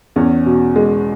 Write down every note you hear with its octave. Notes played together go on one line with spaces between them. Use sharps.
E2 C#4
B2
G#3